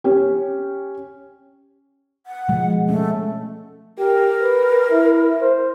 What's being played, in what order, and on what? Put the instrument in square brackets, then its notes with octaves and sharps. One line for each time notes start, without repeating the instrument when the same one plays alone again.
[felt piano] C#4 G4
[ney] F#5
[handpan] B2 F3 G#3
[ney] A3 [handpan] C#4
[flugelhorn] G4 [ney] A#4
[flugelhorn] B4
E4
C5